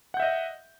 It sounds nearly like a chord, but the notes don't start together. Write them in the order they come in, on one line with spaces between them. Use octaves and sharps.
F#5 G6 E5 D#5